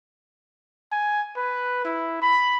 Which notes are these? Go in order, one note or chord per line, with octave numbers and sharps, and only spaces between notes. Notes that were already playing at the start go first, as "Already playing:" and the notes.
G#5
B4
E4
B5